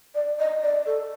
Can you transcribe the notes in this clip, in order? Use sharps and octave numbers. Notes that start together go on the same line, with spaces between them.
D5
D#5
D5
A4